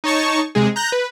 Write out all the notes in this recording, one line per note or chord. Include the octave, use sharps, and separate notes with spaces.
D#4 C#5 A5 C#6
C3 G#3 G#4
A#5 F#6 G6 A#6
B4